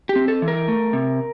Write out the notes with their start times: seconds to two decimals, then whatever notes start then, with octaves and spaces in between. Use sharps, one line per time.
0.09 G4
0.16 C4
0.28 A4
0.42 E3
0.48 A#4
0.68 A3
0.93 C3